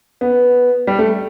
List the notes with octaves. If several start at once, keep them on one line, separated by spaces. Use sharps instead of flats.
B3
G3
A3